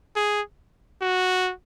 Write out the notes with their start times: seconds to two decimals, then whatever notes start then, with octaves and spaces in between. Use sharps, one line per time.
0.16 G#4
1.01 F#4